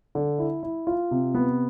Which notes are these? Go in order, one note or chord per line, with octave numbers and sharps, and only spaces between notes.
D3
E4
E4
F4
C3
B3